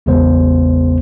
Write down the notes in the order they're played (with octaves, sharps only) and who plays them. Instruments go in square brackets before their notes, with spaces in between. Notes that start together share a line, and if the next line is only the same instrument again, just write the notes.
[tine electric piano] A1 E2 C#3 G#3 B3 C5